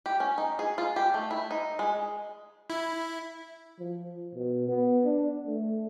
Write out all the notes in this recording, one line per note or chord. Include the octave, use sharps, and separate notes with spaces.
G4
C#4
D#4
G#4
F4
G4
A3
E4
D#4
G#3
E4
F3
B2
B3
D4
A3